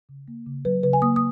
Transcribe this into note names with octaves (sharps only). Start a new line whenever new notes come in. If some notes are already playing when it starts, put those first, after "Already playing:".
C#3
A#3
C#3
F#3 B4
C#3 B4
G#5
A#3 D#6
D#6